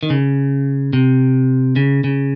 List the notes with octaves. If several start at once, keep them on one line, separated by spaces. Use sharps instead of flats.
D#3
C#3
C3
C#3
C#3